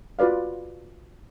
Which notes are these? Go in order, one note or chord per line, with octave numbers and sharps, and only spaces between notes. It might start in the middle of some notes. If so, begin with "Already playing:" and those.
F4 F#4 B4 D5 F5